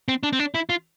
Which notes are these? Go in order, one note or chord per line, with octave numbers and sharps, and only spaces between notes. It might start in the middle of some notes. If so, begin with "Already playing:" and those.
C4
D4
C4
D4
E4
F4